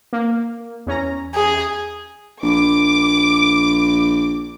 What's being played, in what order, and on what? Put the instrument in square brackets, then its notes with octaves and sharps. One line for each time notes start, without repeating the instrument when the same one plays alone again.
[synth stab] A#3
E2 C#4 A#5
[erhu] G#4
[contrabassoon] A#1 [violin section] D6